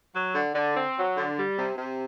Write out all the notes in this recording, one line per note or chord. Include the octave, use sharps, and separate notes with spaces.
F#3
D3
D3
C4
F#3
D3
G3
C3
C3